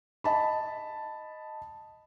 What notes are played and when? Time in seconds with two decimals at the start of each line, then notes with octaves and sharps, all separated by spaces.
0.24 D#5 A5 B5